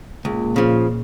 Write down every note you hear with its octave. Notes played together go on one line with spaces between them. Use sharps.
C#2 A#2
C#3 F3